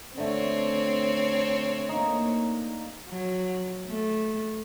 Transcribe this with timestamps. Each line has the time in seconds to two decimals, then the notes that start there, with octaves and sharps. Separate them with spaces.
0.18 D3 A3 C4 C#5
1.89 A#3 D#4
3.08 F#3
3.86 A3